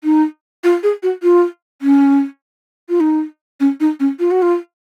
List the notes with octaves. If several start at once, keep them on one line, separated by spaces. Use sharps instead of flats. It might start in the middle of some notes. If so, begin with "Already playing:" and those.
D#4
F4
G#4
F#4
F4
C#4
F4
D#4
C#4
D#4
C#4
F4
F#4
F4